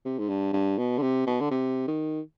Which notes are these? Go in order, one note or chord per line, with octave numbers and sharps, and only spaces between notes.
C3
G#2
G2
G2
B2
D3
C3
B2
D3
C3
D#3